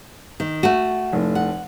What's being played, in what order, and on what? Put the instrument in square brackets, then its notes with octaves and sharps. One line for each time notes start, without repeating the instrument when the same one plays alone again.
[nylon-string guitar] D#3
A3 F#4
[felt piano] F1 A2
[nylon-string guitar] F#5